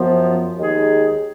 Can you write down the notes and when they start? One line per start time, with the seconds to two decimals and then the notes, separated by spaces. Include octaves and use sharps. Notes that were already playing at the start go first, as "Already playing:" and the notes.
Already playing: F#2 F3 B3
0.57 D#2 D#3 G#3 D#4 G#4